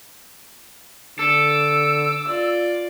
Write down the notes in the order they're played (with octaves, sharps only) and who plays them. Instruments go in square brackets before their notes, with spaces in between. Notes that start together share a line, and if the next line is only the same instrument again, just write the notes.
[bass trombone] D3 [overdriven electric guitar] A4 [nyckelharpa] D6 [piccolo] E6
[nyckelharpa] F4 D5